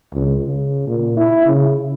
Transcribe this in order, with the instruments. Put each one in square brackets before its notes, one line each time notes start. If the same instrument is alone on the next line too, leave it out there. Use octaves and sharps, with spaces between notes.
[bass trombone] C#2
C#3
A#2
E4
C#3